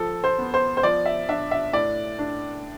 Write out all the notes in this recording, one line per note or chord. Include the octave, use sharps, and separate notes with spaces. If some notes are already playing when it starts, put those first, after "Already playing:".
Already playing: F3 A4
C5
B3
C5
C5
F3 D5
E5
D4 E5
E5
A2 D5
D4